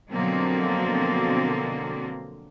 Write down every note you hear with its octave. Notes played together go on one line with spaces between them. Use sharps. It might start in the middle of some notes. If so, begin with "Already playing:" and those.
B2 D3 F3 F#3 A#3 C4